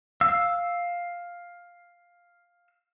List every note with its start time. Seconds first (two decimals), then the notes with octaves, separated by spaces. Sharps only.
0.21 F5 E6